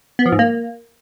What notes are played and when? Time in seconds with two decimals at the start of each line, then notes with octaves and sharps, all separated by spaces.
0.19 B3
0.26 F3
0.32 G#2
0.39 A#3